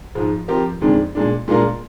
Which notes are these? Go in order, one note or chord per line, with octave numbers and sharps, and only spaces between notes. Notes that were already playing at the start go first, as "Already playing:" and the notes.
G#2 F3 G#3
F3 C4 G4 A#4
F2 D#3 G#3 D4
A#2 G#3 D4
A#2 G#3 D4 F4 A#4